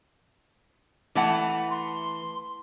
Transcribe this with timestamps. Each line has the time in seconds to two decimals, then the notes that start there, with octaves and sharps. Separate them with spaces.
1.15 E3 A3 F#5
1.71 C6